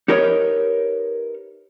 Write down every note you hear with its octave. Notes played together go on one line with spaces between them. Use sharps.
D#4 G4 A#4 B4 C#5 D#5